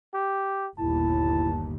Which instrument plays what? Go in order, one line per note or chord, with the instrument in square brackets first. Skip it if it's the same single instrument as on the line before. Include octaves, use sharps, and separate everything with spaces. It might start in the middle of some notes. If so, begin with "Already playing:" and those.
[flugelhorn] G4
[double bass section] G1 D#2 A#2 [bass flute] E4 [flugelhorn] A5